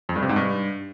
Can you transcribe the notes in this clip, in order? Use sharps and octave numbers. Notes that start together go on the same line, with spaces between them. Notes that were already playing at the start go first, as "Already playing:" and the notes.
F2
G2
C3
G#2
G2